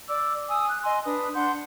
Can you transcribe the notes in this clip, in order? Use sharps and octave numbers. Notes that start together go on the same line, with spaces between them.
D5 D6 E6
G#5 D#6 E6
F#6
D#5 G#5 C6
D4 B4 D#6
D4 F#5 C6 G6